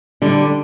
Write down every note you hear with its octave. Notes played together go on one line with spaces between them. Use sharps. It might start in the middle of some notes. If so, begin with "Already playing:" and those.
D3 G3